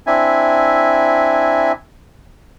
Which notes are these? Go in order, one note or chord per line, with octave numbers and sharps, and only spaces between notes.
C4 D4 E4 E5 G#5